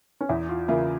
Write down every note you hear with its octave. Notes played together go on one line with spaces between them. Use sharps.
C#4
E2 E4
F4
C#3 E3 A#3 E4 F4